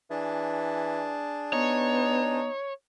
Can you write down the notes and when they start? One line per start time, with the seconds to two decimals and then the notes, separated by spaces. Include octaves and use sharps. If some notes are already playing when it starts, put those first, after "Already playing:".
0.11 E3 D4 G#4 A5
1.53 B3 D#4 C#5